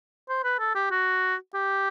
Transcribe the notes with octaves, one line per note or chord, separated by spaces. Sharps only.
C5
B4
A4
G4
F#4
G4